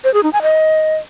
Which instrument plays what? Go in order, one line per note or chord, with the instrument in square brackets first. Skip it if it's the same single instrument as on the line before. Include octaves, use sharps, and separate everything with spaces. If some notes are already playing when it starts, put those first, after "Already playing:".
[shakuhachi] C5
G#4
D#4
G#5
D#5